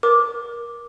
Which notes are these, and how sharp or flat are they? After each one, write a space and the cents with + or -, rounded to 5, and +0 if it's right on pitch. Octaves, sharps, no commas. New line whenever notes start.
A#4 +20 D6 +0